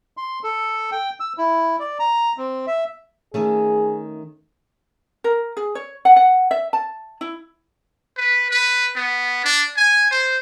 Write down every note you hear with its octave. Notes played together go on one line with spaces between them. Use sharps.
C6
A4
G5
E6
E4
D5
A#5
C4
E5
D#3 A3 C#4 G#4
A#4
G#4
C#5
F#5
F#5
E5
A5
E4
B4
B4
B3
D4
G#5
C5